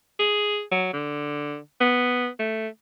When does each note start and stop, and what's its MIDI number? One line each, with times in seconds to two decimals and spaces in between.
0.19 0.62 68
0.71 0.89 54
0.94 1.59 50
1.80 2.29 59
2.39 2.68 57